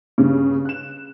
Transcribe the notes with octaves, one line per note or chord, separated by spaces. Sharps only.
G2 C#3
F#6 E7